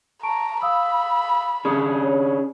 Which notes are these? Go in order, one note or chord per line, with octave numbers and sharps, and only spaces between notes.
A5 A#5 C#6 D7
F5 B5 D#6 E6
C#4 D4 G#4 D#6
C#5